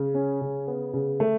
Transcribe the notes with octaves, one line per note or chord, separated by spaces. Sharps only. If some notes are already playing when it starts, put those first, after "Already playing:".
Already playing: C#3
C#4
C#3
B3
C#3
A3